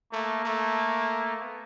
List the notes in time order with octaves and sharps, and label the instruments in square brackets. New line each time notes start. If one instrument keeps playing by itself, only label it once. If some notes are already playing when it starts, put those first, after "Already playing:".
[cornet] A3 [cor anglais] A#3
[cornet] A3
[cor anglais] A#3
B3